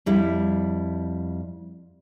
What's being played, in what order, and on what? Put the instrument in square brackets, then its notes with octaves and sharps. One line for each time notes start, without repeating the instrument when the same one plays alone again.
[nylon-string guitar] F2 G3 E4